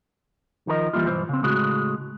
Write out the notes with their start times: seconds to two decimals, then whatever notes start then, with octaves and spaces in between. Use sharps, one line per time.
0.67 D#3 F3 A#4 D#5
0.93 E3 G3 A#3 E4 F4
1.07 B1 G2 E3 C5
1.29 C#3 C4
1.43 A2 C#3 G#3 F#4